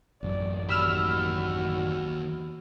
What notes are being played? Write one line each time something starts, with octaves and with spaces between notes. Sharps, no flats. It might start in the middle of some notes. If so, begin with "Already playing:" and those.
A1 F#2 F#3 D5
D#2 F#4 G4 B5 E6 F6